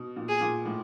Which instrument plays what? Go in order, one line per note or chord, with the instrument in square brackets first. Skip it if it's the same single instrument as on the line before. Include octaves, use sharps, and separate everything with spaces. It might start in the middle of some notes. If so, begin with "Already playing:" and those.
Already playing: [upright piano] B2
A#2
[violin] G#4
[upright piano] A#2
A2